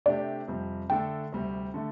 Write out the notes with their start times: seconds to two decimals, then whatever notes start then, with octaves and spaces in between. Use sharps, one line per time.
0.06 C3 A3 D4 G4 D5
0.48 F2 C3 G3
0.90 D3 A3 D4 A4 G5
1.32 D2 C3 G3
1.74 D3 A3